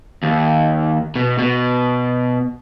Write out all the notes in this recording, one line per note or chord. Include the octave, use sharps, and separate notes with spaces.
D#2
B2
B2